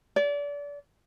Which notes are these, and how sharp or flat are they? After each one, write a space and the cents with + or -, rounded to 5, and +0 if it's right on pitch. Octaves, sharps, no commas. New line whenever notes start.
D5 -30